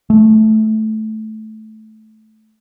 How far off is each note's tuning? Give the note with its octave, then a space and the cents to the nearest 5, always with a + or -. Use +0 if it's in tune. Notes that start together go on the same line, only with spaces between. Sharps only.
A3 -10